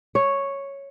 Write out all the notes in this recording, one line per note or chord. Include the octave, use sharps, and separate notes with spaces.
C#5